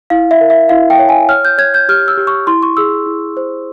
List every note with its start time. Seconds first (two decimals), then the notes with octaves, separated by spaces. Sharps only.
0.10 E4 F5
0.31 E5
0.41 A#4
0.50 E5
0.69 E4 F5
0.90 G5
0.99 C#5
1.09 G#5
1.29 C#5 F6
1.45 G6
1.58 C#5 G#6
1.74 G6
1.89 G4 F6
2.08 E6
2.17 G4
2.27 C#6
2.47 E4 C6
2.63 C#6
2.77 G#4 E6
3.06 E4
3.37 C5